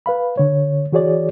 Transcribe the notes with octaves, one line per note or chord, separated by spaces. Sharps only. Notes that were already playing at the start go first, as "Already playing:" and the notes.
B4 F5 B5
D3 C#5
E3 F#4 G#4 C#5 D5